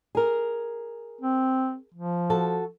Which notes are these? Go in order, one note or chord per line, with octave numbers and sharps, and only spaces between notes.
G#4 A#4
C4
F3
F#4 A4